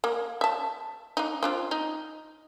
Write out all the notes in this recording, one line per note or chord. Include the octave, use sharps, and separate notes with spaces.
A#3
E5 A5
D4 D#4
C4 D4 F4
D#4